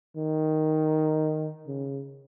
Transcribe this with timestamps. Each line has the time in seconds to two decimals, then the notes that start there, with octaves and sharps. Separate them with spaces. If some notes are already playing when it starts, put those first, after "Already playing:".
0.16 D#3
1.67 C#3